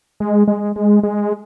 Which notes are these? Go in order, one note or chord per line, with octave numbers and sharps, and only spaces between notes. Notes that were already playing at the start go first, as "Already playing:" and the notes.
G#3
G#3
G#3
G#3